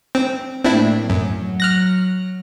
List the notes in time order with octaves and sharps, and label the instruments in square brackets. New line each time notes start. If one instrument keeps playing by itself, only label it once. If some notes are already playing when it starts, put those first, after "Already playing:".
[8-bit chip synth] C4
[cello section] A2 A#3 [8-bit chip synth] C4 D4 E4
[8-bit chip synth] F#2 [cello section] F#3
[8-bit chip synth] F6 F#6 A#6